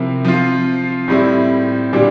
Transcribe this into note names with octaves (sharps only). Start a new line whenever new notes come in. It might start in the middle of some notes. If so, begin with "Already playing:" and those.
Already playing: C3 F3 C4 E4 A#4
F3 C4 F4
A2 G3 C4 E4
A#2 G3 D4 G4